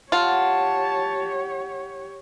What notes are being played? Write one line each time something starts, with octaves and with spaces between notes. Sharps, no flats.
F4 G4 C#5 F#5 A5